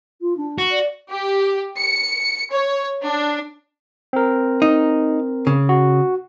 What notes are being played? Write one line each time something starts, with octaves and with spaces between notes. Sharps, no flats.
F4
D4
F#4
D5
G4
C#7
C#5
D4
C4 A#4
D#4
C#3
F#4